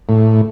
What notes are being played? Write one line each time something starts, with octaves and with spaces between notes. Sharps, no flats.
A2